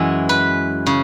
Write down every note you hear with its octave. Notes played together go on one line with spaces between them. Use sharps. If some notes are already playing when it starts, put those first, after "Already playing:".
Already playing: F#2 E3 G#3 E4
B4
C#3